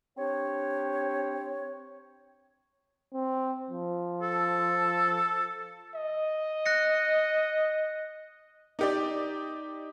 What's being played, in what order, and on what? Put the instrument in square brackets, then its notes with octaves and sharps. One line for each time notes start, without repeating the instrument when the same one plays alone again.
[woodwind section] C4 D4 G4 C#5
[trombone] C4
F3
[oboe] A4
[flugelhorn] D#5
[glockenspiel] F#6 A#6 C#7
[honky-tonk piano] D#4 G4 D5